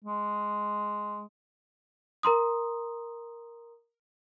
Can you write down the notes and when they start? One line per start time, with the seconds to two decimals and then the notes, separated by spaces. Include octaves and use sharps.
0.04 G#3
2.23 A#4 A#5 C6 D#6